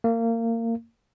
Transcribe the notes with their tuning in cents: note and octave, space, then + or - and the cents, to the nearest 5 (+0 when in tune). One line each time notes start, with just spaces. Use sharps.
A#3 -25